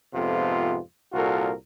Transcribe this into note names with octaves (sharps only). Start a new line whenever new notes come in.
F2 G#2 C3 B3 F4 A4
C2 A#2 F4 F#4 A4 A#4